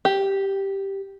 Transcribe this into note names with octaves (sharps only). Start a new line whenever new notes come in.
G4